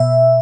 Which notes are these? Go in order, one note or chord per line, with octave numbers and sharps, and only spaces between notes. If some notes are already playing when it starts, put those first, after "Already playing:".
Already playing: B2 E5